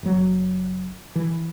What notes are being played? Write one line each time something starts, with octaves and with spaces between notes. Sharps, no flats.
F#1 F#3
E3